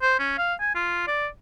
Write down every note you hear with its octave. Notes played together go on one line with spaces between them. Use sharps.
C5
C#4
F5
G#5
F4
D5